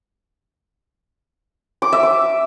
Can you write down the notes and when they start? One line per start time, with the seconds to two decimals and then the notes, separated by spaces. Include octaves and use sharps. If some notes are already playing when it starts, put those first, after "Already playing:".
1.82 D6
1.93 E5
2.03 D6